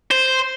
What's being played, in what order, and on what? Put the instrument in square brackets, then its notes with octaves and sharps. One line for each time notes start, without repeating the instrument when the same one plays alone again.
[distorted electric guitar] C5